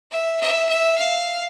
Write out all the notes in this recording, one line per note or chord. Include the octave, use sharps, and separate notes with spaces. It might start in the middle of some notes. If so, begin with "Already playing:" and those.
E5
E5
E5
F5